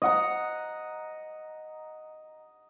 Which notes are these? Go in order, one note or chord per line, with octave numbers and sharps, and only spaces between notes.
D#5 F#5 A#5